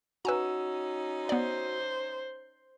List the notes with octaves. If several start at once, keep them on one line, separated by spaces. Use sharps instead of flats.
C#4 D#4 F#4 B4 G#5 A#5 E6
B3 C5 D5